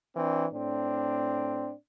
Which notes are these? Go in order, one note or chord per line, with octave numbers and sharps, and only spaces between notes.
E3 C4 D4
A2 C4 D4